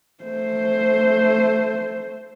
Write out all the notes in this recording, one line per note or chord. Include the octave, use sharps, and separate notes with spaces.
A3 C5